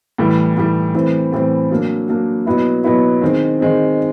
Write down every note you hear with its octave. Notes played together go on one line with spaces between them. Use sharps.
A2 E3 G3
A2 E3 G3
A2 E3 G3 C4
A2 E3 G3 C4
F#3 A#3 D4
F#3 A#3 D4
B2 F#3 B3 E4
B2 F#3 B3 E4
D#3 G#3 C4
D#3 G#3 C4